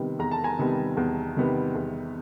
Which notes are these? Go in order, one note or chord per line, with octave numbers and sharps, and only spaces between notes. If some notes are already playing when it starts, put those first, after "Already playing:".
Already playing: C3 D#3 G3 B3
E2 A#5
A5
G#5 A#5
C3 D#3 G3 B3
E2
C3 D#3 G3 B3
E2